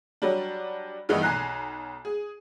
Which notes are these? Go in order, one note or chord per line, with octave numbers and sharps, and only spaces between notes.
F#3 G3 D4
G2 D#3 E3 G3 B3 D#4
B1 G#5 A#5 F#6 C7
G#4